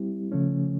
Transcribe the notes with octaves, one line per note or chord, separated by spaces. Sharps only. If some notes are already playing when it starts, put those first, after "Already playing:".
Already playing: G3 C4 E4 G4
C#3 F3 A3 C#4